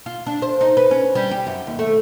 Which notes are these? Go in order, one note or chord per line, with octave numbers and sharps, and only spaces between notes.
F4
D4
C5
D#4
B4
C#4
G3
G4
F#2
D#2
A3